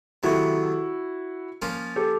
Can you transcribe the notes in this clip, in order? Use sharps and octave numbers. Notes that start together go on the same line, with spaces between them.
C3 D#3 F#3 A3 E4 F#4
F3 A#3 C#4 F4
G4 A4